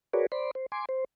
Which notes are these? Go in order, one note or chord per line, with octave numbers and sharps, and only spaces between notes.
F#4 G#4 A#4 B4 C#5 D5
C5 D5 B5 C6
C5
G#5 C6 D6
C5